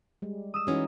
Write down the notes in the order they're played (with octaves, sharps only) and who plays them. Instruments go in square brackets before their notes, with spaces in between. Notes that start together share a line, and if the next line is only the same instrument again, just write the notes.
[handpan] G3 G#3
[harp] D#6 E6 E7
[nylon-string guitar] E3 G#3 C#4 [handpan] D#4 F#4